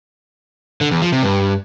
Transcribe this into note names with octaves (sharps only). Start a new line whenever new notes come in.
D3
E2
F3
C3
G2